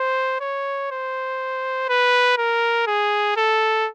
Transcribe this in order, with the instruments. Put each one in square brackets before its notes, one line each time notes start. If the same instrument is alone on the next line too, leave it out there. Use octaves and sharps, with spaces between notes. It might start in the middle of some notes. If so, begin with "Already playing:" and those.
Already playing: [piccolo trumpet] C5
C#5
C5
B4
A#4
G#4
A4